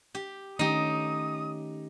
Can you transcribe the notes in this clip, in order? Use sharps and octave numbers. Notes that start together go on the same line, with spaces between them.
G4
D#3 A3 C#4 D#4 G4 D#6